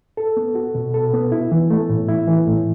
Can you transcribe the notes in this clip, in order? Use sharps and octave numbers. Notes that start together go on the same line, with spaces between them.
A4
B3
F#4
B2
A4
B3
E4
E3
A3
A2
E4
E3
A2